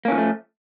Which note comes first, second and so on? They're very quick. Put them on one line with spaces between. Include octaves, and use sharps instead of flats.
A#3 C#4 E3 F3 A3